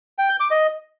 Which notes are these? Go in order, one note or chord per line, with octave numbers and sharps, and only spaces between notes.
G5
G6
D6
D#5